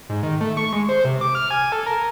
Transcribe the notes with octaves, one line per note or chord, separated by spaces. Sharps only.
G#2
D#3
A3
C#6
G#3
C5
C3
D6
F6
G#5
A4
A#4